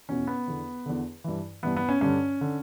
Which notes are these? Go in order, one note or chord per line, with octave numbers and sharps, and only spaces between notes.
E2 B2 C#4
B3
E2 D3
E2 D3
G2 E3
G2 E3 B3
B3
C#4
G2 D3 C#4
D3